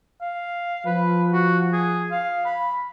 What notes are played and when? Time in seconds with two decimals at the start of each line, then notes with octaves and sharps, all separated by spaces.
0.21 F5
0.86 F3 B4
1.33 F#4
1.73 G#4
2.11 F5
2.45 B5